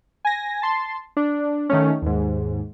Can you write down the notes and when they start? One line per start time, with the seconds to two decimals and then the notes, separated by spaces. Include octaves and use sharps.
0.25 G#5 A#6
0.62 A5 C6
1.17 D4
1.70 D#3 A3 C#4
2.02 D#2 G#2